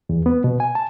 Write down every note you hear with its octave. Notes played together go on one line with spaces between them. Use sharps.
E2
B3
B2
G#5
A5